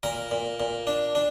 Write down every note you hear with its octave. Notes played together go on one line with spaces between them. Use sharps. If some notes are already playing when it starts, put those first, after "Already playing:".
A#2 A#4
A#2
A#2
D4
D4